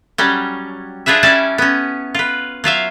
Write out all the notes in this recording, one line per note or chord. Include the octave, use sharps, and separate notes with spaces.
F#3 G3 C#4
D4 F4 G#4 B4 E5
G3 C#4 E4 D5 A5
B3 C#4
F4 B4
F#3 F4 E5 F5